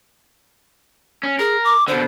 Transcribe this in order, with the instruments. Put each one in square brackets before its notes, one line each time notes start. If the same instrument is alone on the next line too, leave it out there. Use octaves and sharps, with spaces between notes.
[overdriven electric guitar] C#4
[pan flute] G#4 [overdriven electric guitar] A#4
[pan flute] D6
[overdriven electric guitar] B2 D3 [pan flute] C5